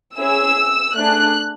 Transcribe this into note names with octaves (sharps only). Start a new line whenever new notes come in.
C#4 E4 G#4 E6
A3 D4 G#4 F#6